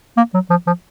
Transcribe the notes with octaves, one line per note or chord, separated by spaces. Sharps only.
A#3
F#3
F3
F3